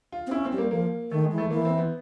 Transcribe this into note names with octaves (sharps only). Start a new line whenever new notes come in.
F4
C4
C#4 E4
C4
G3
A#3
F3 A#3
D#3 A3
G#3
E3
A3
E3 A#3
C4
B3